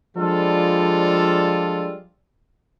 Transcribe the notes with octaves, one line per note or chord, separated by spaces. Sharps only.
F3 G3 G#3 D4 F4 A4